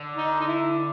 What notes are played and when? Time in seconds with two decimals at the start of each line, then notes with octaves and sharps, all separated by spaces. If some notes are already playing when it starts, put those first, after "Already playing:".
Already playing: D3
0.17 D#4
0.40 D#4
0.48 E4